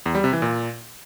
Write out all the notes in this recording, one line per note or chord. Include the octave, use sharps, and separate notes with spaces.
E2
G3
C3
E3
A#2